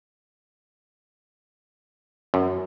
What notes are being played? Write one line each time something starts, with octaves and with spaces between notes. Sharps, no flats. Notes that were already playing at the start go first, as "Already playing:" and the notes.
F#2